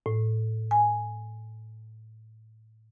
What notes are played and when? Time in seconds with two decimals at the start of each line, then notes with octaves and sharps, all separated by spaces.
0.06 A2
0.71 G#5